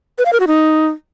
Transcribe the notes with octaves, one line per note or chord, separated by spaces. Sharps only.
B4
F5
A#4
F#4
D#4